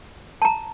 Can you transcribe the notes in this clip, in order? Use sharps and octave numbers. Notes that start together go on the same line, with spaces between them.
A5
A#5